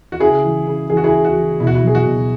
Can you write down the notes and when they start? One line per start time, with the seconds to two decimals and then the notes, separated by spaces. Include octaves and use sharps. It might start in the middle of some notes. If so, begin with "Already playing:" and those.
0.12 F#4
0.20 C#3 E4 G#4
0.43 E3
0.67 C#3
0.90 E3 G#4
0.97 F#4
1.04 E4 G#4
1.14 C#3
1.24 F#4
1.36 E3
1.60 B2 E4
1.67 F#4
1.75 E4
1.83 F#3 G#4
1.95 F#4
2.06 B2